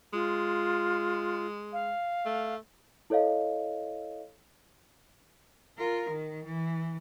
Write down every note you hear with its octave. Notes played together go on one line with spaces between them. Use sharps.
G#3 F4
F5
A3
E4 A4 C#5 D#5 F5
F4 A#4
D#3
E3